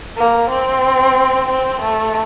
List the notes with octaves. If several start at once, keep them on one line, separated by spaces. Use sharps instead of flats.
A#3
C4
C4
A3